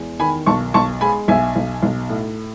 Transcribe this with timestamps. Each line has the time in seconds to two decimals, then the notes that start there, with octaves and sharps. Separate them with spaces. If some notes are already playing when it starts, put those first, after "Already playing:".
Already playing: E2 G#3
0.20 D#3 G#5 B5
0.46 B1 A5 C#6
0.74 B1 A5 C#6
1.01 G#3 G#5 B5
1.28 B1 E5 G#5
1.56 B1
1.83 B1
2.09 A2